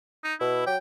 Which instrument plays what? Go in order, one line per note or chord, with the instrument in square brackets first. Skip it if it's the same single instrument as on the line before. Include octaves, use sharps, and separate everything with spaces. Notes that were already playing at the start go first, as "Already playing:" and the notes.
[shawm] D#4
[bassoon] B2 [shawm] E4
[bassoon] F#3 [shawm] G5